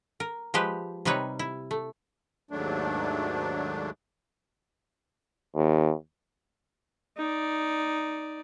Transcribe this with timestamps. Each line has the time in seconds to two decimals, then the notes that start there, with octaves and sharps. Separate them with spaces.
0.20 A#4
0.54 F3 G#3 G4 B4
1.05 C3 G3 D#4 B4 C#5
1.39 E4
1.71 A3
2.51 D#2 G#2 F#3 A3 D4
5.55 D#2
7.17 D#4 D5